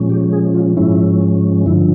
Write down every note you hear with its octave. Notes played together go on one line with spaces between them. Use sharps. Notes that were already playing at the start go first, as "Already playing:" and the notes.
Already playing: A#2 F3 G#3 C#4
G4
G#4
F4
G#2 F3 G#3 C#4 E4
G2 D3 F3 E4